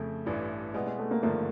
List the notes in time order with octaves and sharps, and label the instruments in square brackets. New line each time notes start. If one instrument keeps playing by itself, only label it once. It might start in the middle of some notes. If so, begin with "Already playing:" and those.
Already playing: [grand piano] F2 C#3 [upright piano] A3
[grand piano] A1 G2 E3 G3
[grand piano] B2 G3 B3 E4 [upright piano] G#3
[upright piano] G#3
A3
A#3
[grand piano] G#1 G2 D3 F3 A3 [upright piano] A#3